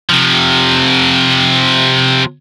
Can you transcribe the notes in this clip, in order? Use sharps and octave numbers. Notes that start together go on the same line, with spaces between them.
C3 F3